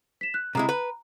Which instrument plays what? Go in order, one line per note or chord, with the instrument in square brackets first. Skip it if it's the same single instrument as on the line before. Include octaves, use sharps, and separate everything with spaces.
[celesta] B6 E7
F#6
[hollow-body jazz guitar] C3 G#3 E4 [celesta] A#5
[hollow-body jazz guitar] B4